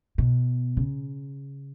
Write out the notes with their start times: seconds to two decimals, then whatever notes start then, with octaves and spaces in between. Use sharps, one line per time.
0.18 B2
0.77 C#3